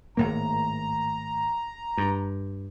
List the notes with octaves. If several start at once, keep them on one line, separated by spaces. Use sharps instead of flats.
G#1 A2 A#3 A#5
G2